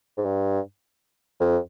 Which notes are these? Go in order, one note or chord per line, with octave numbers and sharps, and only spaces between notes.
G#2
G2
F2